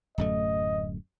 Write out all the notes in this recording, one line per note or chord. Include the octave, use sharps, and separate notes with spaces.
D1 F#2 A3 D#5